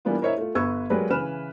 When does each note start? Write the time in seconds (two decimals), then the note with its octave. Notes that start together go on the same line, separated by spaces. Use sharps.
0.05 E3 G3 A#3 B3 D4 F4
0.21 E4 A#4 C5 C#5 D#5 E5
0.37 A3 F4
0.55 G1 B4 C#6 E6 G#6
0.90 F#3 G#3 A#3 G4 B4 D5
1.10 C#3 E3 E4 B4 F6 E7